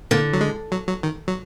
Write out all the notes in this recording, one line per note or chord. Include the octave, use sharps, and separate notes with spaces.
D3 A#3
F#3
G#3
F#3
F#3
D#3
F#3